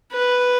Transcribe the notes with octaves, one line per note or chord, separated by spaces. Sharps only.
B4